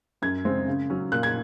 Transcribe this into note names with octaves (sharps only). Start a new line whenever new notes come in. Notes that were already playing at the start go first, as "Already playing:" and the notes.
F#2 G#6
C#3 G#3 C4
C#3
F#3 C#4
A#2 F#6
G#6